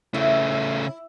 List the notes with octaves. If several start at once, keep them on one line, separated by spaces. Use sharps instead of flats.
C#3 A3 E4